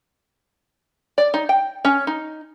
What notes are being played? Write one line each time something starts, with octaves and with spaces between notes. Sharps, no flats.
D5
D#4
G5
C#4
D#4